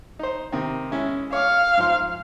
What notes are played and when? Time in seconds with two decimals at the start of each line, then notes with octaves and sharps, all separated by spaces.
0.19 D#4 C5
0.52 C3 D#3
0.91 G#3 C#4 E4
1.33 C#5 F5 D6
1.77 G#2 F3 C6